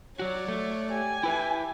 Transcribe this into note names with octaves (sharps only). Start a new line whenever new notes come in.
F#3 F#4 C#5 D5
A3
G4 G#5
E4 B4 E5